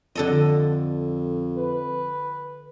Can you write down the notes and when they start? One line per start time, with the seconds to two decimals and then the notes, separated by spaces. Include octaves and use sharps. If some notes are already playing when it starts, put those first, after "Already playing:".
0.15 F2 D3 A4 D#5
1.58 B4